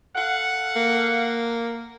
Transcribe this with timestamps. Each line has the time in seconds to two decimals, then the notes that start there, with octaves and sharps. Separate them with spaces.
0.16 A4 F5 F#5
0.76 A#3